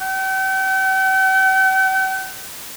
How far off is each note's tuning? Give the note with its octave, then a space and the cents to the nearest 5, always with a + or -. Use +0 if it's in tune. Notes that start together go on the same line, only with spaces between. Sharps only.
G5 -45